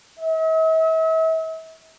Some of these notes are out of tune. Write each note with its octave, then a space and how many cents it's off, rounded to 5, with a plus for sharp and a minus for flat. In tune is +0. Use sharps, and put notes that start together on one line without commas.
E5 -45